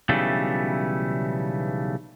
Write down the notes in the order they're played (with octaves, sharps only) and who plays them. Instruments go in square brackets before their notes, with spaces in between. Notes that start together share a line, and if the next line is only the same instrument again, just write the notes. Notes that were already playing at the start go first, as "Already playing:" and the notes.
[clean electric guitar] B1 C#3 E3 G3 A3